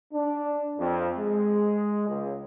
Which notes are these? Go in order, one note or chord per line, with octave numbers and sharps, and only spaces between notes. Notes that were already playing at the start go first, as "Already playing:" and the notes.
D4
F2
G#3
C#2